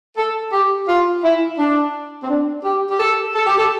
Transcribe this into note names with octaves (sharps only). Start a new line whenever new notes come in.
A4
G4
F4
E4
D4
C4
D4
G4
G4
A4
A4
G4
A4